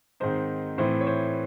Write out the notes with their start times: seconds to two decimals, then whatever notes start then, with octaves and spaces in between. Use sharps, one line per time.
0.20 G#2 D#3 G#3 C4 D#4 C5
0.78 A2 E3 C4 C5
1.01 C#5
1.07 C5